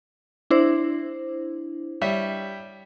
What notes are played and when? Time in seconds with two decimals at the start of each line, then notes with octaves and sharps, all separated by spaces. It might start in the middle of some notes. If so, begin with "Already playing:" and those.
0.50 D4 E4 C5
2.01 G3 C#5 E5